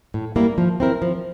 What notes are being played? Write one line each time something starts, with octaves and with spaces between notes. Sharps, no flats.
A2
G3 A#3 E4 A#4
F3
C4 E4 A#4
F3